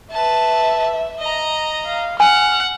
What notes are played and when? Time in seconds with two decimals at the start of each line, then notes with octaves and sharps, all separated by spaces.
0.12 B4 E5 A5
1.19 D#5 A#5
1.86 F5
2.20 F#5 G#5 F6